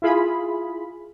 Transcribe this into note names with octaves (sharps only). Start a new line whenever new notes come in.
E4 F4 G#4 B5